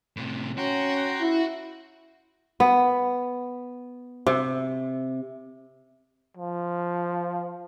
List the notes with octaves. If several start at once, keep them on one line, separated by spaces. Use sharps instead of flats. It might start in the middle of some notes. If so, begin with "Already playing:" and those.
A2 C3
C#4 F#4 G5 A#5 C6
E4
B3
C3
F3